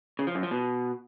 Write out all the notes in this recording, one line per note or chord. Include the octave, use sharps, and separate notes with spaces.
C#3
F3
F#2
F3
B2